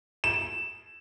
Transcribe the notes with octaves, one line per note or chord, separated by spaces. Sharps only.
E7